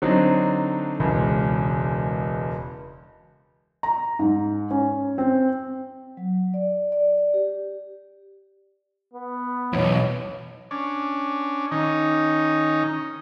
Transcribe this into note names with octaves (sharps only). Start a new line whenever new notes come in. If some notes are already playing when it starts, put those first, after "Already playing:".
D3 F#3 C4 D4 D#4
E1 C#2
A#5
G#2
C#4
C4
F#3
D5
D5
D5
G4
B3
B1 E2 E3 C#5
C#4 D4
D#3 C#4 D#4